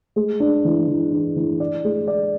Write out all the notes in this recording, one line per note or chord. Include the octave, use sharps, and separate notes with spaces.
G#3
D4
E3
E3
D4
E3
D5
G#3
D5